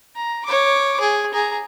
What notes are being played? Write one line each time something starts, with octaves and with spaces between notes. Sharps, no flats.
A#5
C#5 D6
G#4
G#4 A#5